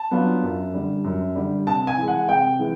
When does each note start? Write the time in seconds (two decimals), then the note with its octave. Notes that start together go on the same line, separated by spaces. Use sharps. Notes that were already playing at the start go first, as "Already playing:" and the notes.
Already playing: A5
0.11 F#3 B3 D4 F4
0.43 F#2
0.74 D3 G3
1.04 F#2
1.35 D3 G3
1.66 C3 A5
1.87 G#5
1.97 E3 G#3
2.08 F#5
2.28 C3 G5
2.59 E3 G#3